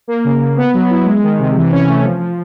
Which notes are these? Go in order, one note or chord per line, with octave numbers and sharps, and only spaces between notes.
A#3
C#3
C#3
B3
F#3
E4
G#3
D#3
C3
E3
C#4
A3
F3
F3